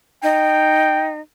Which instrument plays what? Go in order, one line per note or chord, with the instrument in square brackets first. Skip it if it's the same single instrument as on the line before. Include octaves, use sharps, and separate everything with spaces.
[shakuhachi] D#4 [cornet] G5